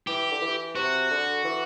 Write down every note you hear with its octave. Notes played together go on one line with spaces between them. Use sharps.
E3 G4
D3
E3
C3 F#4
D3
E3